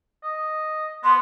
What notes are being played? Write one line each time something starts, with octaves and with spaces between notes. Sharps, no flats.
D#5
B3 C6